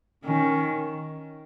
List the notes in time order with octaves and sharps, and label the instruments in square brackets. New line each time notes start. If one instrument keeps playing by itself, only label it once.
[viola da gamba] D#3 [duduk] C#4